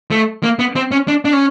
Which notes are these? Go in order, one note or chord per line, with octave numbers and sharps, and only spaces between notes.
A3
A#3
B3
C4
C#4
D4
D4
C#4